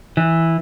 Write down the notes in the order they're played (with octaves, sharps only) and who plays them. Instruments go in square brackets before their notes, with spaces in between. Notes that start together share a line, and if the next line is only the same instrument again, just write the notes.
[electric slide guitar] E3